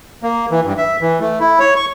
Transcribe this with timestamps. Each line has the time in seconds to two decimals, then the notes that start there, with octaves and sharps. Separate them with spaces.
0.23 A#3
0.51 E3
0.65 G2
0.78 E5
1.01 E3
1.20 A3
1.40 E4
1.59 C#5
1.76 C#6